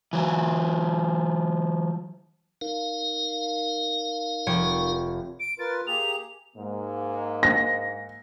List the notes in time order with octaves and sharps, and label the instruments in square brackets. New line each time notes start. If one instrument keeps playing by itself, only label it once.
[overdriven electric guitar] E3 F#3
[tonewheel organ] D#4 A#4 F5
[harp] F1 C#5 G5
[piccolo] D7
[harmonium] F4 A#4 B4 [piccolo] A6
[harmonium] A#3 G4 G#4 [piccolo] F7
[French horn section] G#2 A#3
[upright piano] A#6